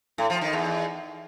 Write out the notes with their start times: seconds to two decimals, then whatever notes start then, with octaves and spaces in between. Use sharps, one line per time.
0.18 A2
0.30 F3
0.41 D#3
0.53 E2